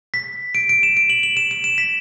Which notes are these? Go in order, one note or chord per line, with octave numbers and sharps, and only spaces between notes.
B6
D7
D7
E7
D7
F#7
F#7
E7
E7
E7
B6